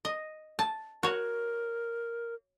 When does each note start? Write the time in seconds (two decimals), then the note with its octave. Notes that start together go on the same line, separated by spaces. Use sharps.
0.05 D#5
0.59 A5
1.03 F#4 A#4 C#5